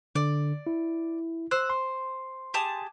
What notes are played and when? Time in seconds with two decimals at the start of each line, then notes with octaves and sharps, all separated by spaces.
0.15 D3 D5
0.67 E4
1.51 C5 E6 F#6
1.70 C6
2.54 G4 G#4 A5